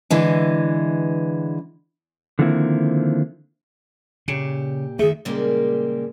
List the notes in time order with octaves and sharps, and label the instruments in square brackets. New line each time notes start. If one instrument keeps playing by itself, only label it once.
[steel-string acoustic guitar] D3 E3 G#3
[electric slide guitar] D3 D#3 F3 A#3 C4 E4
[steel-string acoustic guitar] A#2 G4 [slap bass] C#3
[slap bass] D#3 A3 [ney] G#4 [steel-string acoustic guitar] E5
[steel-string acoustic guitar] A#2 C#3 G3 G#3 A#3